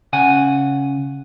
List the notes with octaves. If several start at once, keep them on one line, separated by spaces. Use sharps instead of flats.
C#3 F#5 G#5